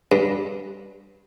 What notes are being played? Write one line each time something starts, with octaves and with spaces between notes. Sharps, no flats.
G2